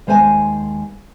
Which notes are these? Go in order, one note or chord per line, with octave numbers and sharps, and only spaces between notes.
D#2 G#3 C5 E5 G#5 A5